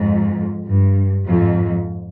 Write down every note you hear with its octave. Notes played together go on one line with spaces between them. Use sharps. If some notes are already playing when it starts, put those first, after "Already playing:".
Already playing: F2 G#2
G2
F2 G#2